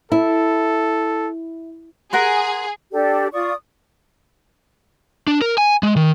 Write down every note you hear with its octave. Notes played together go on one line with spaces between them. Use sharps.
E4 A4
G#4 A#4 F#5 C6
D4 G4 A4 D5
F4 D5 C#6 D#6
D4
A#4
G#5
G#3
D#3